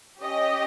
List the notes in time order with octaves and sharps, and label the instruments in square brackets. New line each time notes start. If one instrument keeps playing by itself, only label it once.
[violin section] C#4 G4 D#5